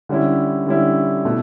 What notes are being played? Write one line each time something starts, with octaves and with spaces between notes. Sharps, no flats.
D3 G3 C#4 E4
D3 G3 C#4 E4
B2 A3 E4